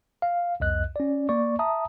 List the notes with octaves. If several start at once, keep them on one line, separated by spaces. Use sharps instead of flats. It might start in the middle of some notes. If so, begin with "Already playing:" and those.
F5
C2 F2 D#5 F#6
C#4 D5
A#3 D5 C#6
E5 A5 A#5 D#6